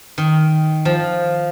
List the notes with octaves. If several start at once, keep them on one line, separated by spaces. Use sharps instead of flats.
D#3
F3